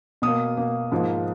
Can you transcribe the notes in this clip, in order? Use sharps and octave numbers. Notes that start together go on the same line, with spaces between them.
B2 A#3 D#6
B2 A#3
G#2 F3 A#3